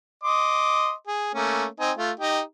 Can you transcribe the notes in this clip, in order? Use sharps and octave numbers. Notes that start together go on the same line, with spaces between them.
D#5 C6 D6
G#4
A3 A#3 C#4
C4 D#4 G#5
A3 F4
D#4 G4